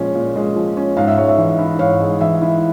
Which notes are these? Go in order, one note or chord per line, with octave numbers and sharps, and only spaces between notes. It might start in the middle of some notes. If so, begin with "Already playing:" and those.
Already playing: A#2 F3 G#3 C#4
A#2
G#3
F3
C#4
G#2 F5
E5
G#3 C#5
E5
E3
E4
G#2 C#5 F5
G#3
E3 E5
E4